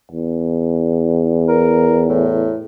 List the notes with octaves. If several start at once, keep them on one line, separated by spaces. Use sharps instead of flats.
E2
A#4
A2